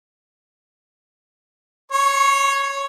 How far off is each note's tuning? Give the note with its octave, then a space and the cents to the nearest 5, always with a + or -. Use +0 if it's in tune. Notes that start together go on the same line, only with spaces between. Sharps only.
C#5 +0 C#6 -40